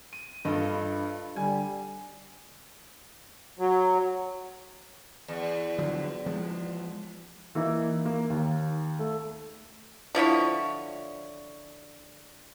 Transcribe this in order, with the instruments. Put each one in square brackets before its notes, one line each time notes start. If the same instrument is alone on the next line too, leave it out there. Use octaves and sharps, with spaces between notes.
[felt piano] D#7
[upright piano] G2 [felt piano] F4 A4 D#5
[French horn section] D3 G3 [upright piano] G#5
[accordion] F#3
[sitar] E2
[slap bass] D3 F3 F#3
F3 G#3
[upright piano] E3 A#3 D#4 E4
A#3
D#2
A3
[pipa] D3 F3 E4 C#5